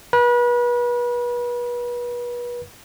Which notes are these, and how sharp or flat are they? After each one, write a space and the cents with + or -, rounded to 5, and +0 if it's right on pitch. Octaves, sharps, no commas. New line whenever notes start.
B4 -35